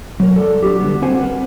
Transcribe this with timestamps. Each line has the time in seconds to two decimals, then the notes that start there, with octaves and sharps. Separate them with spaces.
0.20 F#3 A#4
0.36 A4 D5 A5
0.63 D4 F#4 G4
0.80 D3 G3 B3
1.02 C4 F#4 C5 F#5 G#5
1.20 A#4 B4